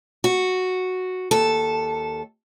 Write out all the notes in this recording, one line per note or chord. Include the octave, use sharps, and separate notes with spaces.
F#4
D#2 A4